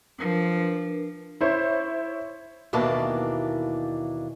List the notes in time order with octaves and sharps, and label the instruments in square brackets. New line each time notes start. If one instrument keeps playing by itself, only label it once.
[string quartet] F3 [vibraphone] D4 A#4 B4
[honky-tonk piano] E4 C5 C#5
[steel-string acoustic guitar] D#2 B2 E3 A#3 D4 A5